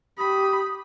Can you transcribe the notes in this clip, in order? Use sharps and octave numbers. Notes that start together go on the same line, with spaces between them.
G4 B5 D#6